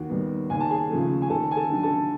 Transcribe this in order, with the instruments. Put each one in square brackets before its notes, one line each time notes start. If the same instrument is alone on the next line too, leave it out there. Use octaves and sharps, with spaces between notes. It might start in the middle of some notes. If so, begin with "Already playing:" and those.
Already playing: [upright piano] D#2 F#4
D#3 G3 B3
D#2 G#5
A5
G#4 G#5
C#3 F3 A3
G#5
D#2 A4 A5
G#5
A4 A5
D3 F#3
A4 A5